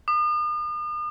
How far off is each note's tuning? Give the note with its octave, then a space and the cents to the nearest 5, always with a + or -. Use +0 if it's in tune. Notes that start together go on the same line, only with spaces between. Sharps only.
D#6 -45